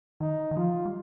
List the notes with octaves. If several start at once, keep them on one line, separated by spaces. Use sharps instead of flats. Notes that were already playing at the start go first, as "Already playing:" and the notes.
D#3 D#4
D#3
F3 F4
G3